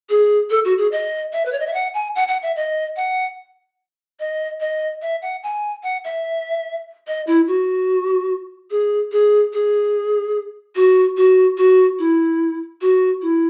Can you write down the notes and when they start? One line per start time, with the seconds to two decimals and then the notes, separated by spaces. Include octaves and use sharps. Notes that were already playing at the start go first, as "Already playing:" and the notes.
0.09 G#4
0.50 A4
0.65 F#4
0.78 G#4
0.92 D#5
1.33 E5
1.45 B4
1.52 C#5
1.60 D#5
1.67 E5
1.73 F#5
1.94 G#5
2.15 F#5
2.28 F#5
2.43 E5
2.56 D#5
2.96 F#5
4.19 D#5
4.60 D#5
5.02 E5
5.22 F#5
5.43 G#5
5.83 F#5
6.04 E5
7.07 D#5
7.27 E4
7.47 F#4
8.70 G#4
9.12 G#4
9.53 G#4
10.75 F#4
11.17 F#4
11.57 F#4
11.99 E4
12.81 F#4
13.22 E4